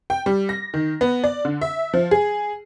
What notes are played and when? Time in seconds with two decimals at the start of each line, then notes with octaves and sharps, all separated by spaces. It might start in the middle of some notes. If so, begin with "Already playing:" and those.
0.10 G5
0.26 G3
0.49 A#6
0.74 D#3
1.01 B3
1.24 D5
1.45 D3
1.61 E5
1.94 F3
2.11 G#4